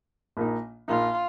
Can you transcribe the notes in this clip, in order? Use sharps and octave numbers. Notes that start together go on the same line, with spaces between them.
A#1 A#2 A#3 D#4
A#1 A#2 A#3 D#4 F4